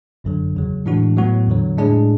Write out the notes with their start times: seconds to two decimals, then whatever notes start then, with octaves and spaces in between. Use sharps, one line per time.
0.24 G#1 F#2 D3 F#3
0.55 E2 C#3 F#3
0.86 A2 E3 G#3 D4 F#4
1.17 A2 F#3 B3 F#4
1.48 E2 D3 F#3
1.78 A2 G#3 D4 G#4